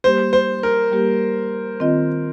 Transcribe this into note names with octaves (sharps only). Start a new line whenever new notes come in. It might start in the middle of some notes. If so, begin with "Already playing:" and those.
G3 A#3 G4 C5
C5
A#4
G3 A#3 G4
D#3 C4 F4 D#5